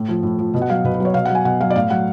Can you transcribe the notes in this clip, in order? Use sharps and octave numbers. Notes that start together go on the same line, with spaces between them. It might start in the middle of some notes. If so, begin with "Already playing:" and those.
Already playing: A2
F3
A2
F3
B2
F#5
F#3 F5
B2 B4
B4
F#3 C#5
B2 F5
F#3 F#5
G#5
B2 F#5
F#3 F5
D5
A2 F5
F#3 F#5